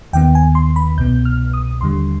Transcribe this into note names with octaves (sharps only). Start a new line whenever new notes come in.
D#2 D#3 B3 G5
G#5
C6
B5
C2 B2 B3 G6
F6
D#6
D#2 D3 G3 C6